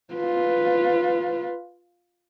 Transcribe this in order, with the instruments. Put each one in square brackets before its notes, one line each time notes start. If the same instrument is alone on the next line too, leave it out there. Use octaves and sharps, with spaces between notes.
[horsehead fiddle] F4 B4